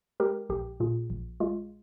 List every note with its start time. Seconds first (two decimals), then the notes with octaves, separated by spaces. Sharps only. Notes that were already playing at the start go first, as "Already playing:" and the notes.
0.20 G#3 G4 A#4
0.49 A#1 G4
0.80 A#2 F4 G#4
1.10 A#1
1.40 G#3 F4